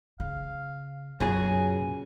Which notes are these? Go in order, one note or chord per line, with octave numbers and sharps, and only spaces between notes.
C#3 F5
B1 F#2 A#2 C#3 F#4 G#4 G#5